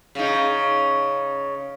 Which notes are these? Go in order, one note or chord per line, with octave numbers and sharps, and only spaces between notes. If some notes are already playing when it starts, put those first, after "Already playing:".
C#3 D#4